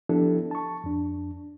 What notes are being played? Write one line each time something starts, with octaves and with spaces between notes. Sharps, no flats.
F3 B3 D4 E4 G4 A4
A5 C#6
F2 D4